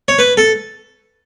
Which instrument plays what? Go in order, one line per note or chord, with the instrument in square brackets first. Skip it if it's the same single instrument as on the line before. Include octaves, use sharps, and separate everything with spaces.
[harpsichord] C#5
B4
A4